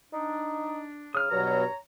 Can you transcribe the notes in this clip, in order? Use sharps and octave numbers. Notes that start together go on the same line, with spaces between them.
D4 D#4
C#3 D#6 F6
G2 B2 F#3 C#5 A#5